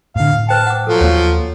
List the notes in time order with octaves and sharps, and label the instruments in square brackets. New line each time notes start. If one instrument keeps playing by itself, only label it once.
[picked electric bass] A2 D3 [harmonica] F5
[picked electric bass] A2
[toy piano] B4 C5 G5 [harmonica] A5
[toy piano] F#5 D6
[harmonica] F3 F#3 [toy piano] A4
[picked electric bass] D#2 A#3 [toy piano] C#5 F5